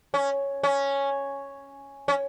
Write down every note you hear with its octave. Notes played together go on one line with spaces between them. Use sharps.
C#4
C#4
C#4